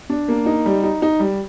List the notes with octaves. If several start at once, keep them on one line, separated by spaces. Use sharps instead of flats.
D4
A#3
D#4
G3
D#4
D#4
G3